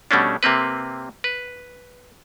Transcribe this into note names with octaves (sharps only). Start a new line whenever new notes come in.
B2 G3 A3 C#4 D4
C3 A#3 C4 B4
B4